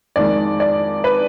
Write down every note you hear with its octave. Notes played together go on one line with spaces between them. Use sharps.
F2 D#3 G#3 D5
D5
B4